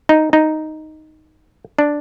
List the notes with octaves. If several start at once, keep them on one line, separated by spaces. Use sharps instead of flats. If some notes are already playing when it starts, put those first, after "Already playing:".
D#4
D#4
D4